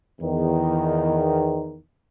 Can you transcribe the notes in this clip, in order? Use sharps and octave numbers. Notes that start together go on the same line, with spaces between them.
E2 D#3